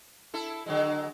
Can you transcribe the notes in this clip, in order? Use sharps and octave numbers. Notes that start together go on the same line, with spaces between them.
E4 A4
D3 F#3 G#3